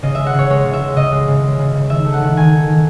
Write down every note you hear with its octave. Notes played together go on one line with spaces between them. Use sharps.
C#3 D#5
G#3 E5
F#5
C#3 C#5
G#3 C#5
C#3
E5
G#3
C#3 D#5
G#3
C#3
G#3
C#3
C#3
D#3 E5
A3
F#5
D#3
D#3 G#5
A3
D#3